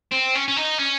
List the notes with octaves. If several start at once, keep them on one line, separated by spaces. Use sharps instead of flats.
C4
C#4
C#4
D#4
C#4